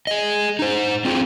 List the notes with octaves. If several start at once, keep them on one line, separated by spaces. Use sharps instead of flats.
G#4 D#5
D#4 C5
C4 F4 G#4 C5